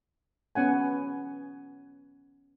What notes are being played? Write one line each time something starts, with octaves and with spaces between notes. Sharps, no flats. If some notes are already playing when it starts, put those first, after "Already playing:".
B3 C#4 F#5 G#5